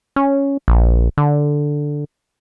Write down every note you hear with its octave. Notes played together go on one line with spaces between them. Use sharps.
C#4
A#1
D3